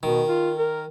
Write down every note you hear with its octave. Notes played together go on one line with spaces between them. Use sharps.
B2 D#3
F4
A#4